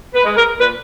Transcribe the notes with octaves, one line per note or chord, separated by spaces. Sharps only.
B4
G#3
A#4
A#2 B4